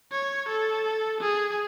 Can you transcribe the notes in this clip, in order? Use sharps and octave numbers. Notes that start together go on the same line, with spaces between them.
C#5
A4
G#4